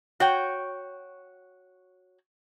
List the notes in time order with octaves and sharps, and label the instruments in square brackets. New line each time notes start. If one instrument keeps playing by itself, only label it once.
[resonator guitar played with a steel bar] F#4 C#5 G5